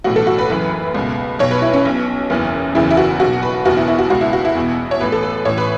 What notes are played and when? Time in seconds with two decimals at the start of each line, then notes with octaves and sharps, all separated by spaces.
0.04 B1 A2 E3 F#4
0.16 A4
0.27 F#4
0.38 B4
0.50 F#1 F#2 E3
0.94 C#2 B2
1.39 B1 B2 C#5
1.51 B4
1.62 E4
1.74 C#4
1.85 B1 B2
2.30 F#1 E2 E3
2.75 F#1 E2 C#3 E3 E4
2.91 E4
2.97 F#4
3.20 B1 B2 F#4
3.42 B4
3.65 F#1 E2 B2 F#4
3.77 E4
3.88 E4
3.99 F#4
4.10 C#2 B2 F#4
4.21 E4
4.33 F#4
4.45 E4
4.55 E2 B2
4.91 C#5
5.00 A1 A2 E3 B4
5.12 A4
5.23 B4
5.45 A1 A2 E3 C#5
5.57 B4